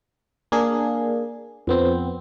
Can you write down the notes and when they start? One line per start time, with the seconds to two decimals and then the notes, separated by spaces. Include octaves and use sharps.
0.52 A#3 D4 G#4
1.67 F2 B3 C4